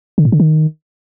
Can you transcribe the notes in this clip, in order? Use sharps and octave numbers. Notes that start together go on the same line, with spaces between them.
D3
A2
D3
D#3